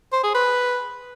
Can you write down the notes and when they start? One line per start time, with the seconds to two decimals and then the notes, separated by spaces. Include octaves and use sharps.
0.12 C5
0.23 G#4
0.35 B4